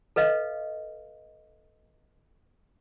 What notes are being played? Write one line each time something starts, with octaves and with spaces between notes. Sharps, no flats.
A4 B4 D#5 F5